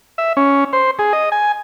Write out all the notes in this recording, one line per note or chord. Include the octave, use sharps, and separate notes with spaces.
E5
C#4
C5
G#4
D#5
G#5